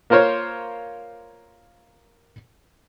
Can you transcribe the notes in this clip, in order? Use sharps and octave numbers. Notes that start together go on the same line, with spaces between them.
A#3 F4 A#4 C5 C#5